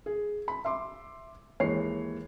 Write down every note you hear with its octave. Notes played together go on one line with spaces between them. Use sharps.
G#4
B5
E5 C6 D6
D#2 E3 G#3 C#5 C7